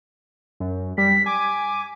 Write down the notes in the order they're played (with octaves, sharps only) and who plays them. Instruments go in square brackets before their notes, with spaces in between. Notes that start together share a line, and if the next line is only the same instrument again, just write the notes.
[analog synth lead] F#2
[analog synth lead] G3 [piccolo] B6
[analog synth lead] G#5 [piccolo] D6